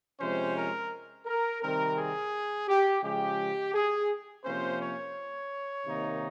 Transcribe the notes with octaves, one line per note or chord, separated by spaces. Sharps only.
C3 F3 G#3 C#4 C5
A#4
A#4
C3 D#3 G3 C4 A#4
G#4
G4
C#3 F3 G#3 G4
G#4
C3 F3 A#3 C#4 C5
C#5
C3 D#3 A#3 D#4